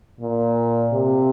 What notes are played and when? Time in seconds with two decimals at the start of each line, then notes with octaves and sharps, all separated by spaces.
0.20 A#2
0.92 C3